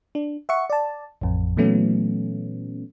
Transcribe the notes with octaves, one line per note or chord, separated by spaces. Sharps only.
D4
E5 F#5 C#6 C#7
D5 A5
A1 F2
A#2 E3 F#3 A3 B3 C#4